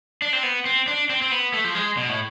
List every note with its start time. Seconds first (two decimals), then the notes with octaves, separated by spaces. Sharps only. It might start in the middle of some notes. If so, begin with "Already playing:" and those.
0.22 D4
0.33 C4
0.43 B3
0.65 C4
0.87 D4
1.09 C4
1.22 C4
1.31 B3
1.54 A3
1.65 F3
1.75 G#3
1.97 B2
2.09 A2